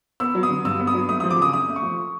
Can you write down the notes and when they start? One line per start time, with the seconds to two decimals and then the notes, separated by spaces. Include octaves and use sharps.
0.20 B3 E6
0.35 F#3
0.43 D#6
0.50 D3
0.65 G2 E6
0.80 B3
0.87 D#6
0.94 F#3
1.08 A3 D#6
1.20 F3 D#6
1.30 D6
1.38 C#3 D#6
1.53 F#2 D#6
1.68 A3
1.76 C#6
1.83 F3